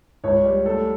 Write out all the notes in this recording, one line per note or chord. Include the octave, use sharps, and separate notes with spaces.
C#2 C#5
G3
A3 A4